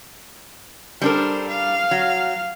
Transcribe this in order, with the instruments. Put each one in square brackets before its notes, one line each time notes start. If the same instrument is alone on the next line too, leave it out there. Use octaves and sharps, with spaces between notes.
[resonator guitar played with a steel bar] G3 D4 A#4 [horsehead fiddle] A4 C5
[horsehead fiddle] F5
[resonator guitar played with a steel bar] F#3